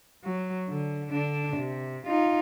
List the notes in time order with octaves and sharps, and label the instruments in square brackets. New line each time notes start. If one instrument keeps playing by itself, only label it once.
[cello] F#3
D3
D3 D4
C3
D#4 F4